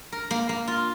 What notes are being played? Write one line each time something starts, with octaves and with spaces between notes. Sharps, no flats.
A#4
A#3
A#3
F4